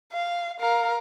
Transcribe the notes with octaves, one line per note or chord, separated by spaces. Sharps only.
F5
A#4 F5